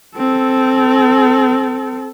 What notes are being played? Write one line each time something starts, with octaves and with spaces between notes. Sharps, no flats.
C4 A4